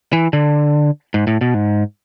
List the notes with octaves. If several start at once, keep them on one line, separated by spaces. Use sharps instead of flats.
E3
D3
G#2
A2
B2
G#2